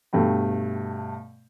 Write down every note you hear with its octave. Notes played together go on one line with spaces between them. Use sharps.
G2 B2 A3 G5 B5